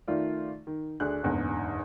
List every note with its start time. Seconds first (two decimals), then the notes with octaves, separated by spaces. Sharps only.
0.08 D#3 A3 F4 D5
0.67 D#3
1.00 D2 D4 G#4 F#6
1.23 F#1 E2 G#2 D3